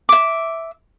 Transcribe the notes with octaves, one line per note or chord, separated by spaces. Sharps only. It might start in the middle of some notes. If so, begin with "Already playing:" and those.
E5 D6